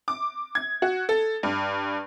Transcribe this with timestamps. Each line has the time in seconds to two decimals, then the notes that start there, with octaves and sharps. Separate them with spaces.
0.08 D6
0.55 G#6
0.82 F#4
1.09 A4
1.43 G2